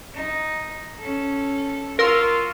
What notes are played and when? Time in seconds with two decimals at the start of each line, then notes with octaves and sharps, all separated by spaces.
0.14 D#4
0.99 C#4 A4
1.99 F4 F#4 A#4 C6 E6